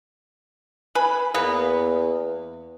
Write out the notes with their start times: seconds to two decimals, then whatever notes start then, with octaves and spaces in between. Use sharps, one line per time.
0.95 B4 G#5 B5
1.34 E2 A#3 B3 B4